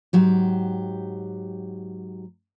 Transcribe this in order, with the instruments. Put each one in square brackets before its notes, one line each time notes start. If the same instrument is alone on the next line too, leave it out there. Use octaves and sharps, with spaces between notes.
[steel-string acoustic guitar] G#2 F#3 G4